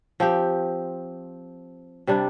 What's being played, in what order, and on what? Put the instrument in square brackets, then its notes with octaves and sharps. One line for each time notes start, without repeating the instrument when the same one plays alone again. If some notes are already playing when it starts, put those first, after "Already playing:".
[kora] F3 C4 G4
C3 G3 D4